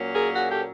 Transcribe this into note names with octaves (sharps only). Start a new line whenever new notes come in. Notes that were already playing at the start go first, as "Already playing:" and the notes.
Already playing: A#2 F#3 A#3 C#4
G#4 A#4
F#4 G#4
G4 A4